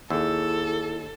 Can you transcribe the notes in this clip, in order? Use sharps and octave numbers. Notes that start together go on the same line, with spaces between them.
D#2 E4 G#4 A4 E6